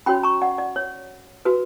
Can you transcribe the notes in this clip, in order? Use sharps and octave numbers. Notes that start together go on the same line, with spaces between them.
C#4 F#4 C#5 G5 B5
A#5 C#6
D5 F#5
D5
C#5
F#4 B4